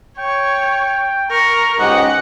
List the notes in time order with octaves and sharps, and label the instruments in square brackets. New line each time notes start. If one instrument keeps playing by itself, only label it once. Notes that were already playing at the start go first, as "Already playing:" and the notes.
[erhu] C#5 [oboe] G5
[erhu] A#4 [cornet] A#5 [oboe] C#6
[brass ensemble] C#2 G#2 D#5 [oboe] F#4 [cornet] G4 [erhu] F#5